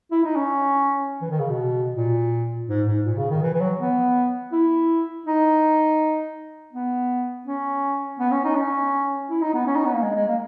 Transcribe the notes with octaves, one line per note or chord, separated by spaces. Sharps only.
E4
D#4
C#4
E3
D#3
C#3
B2
A#2
G#2
G#2
A#2
C#3
D#3
E3
E3
F#3
B3
E4
D#4
B3
C#4
B3
C#4
D#4
C#4
E4
D#4
B3
C#4
D#4
B3
A#3
G#3
G#3
A#3